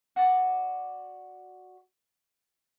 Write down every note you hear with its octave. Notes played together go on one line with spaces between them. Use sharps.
F#4 D5